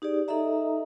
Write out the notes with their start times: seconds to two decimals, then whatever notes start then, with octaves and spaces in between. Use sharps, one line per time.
0.02 D#4 G4 G#4 D5
0.28 D#4 A4 D#5 E5 A#5